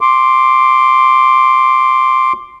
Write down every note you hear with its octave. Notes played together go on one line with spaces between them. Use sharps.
C6 D6